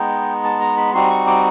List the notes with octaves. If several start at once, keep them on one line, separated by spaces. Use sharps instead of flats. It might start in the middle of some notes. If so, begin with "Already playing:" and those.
Already playing: G#3 B3 D#4 G5
A5
A#5
B5
G3 C4 D#4 F#4 C6
C#6
D6